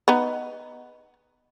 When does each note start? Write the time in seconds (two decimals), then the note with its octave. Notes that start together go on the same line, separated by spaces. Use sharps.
0.08 B3 D#4